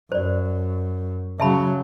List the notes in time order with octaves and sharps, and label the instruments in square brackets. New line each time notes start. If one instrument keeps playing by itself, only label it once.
[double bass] F#2 [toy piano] C5 D5
[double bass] C#3 F#3 [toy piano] E5 A5 B5